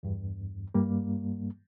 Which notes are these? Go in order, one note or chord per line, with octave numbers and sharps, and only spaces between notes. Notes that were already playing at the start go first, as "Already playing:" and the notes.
E2 G2
G2 G3 A#3